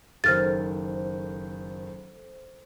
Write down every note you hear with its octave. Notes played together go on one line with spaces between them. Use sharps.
F#1 D#3 A4 C5 F6 A6